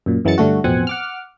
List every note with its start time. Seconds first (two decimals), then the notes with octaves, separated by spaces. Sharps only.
0.06 F#2 A#2
0.25 F#2 E3 F#3 G#3 A6 C#7
0.38 G2 D3 A3 F#4
0.64 A1 F2 B2 C4 F#5 G#5
0.87 F#5 D6 F6